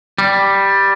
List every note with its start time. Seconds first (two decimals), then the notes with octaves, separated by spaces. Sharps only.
0.18 G3